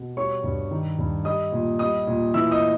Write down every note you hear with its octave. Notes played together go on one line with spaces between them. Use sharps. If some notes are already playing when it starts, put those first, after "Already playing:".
Already playing: B2
G3 C#5 C#6
G2
D#3
G2
G3 D#5 D#6
A#2
G3 D#5 D#6
A#2
E3 E5 E6
D#5 D#6